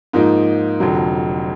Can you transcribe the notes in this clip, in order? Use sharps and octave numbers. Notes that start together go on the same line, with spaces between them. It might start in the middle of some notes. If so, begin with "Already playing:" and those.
G#2 F3 A#3 D#4
F1 F2 D3 F#3